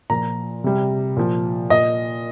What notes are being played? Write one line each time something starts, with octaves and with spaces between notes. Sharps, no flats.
A#2 F3 A#5
C3 G3
A#2 F3
A#2 D#5